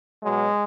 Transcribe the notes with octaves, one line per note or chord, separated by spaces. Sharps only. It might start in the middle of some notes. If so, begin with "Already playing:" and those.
B2 F#3 G#3